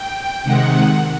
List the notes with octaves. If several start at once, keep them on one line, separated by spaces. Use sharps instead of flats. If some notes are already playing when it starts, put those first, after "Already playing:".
Already playing: G5
C3 D#3 G#3 F#5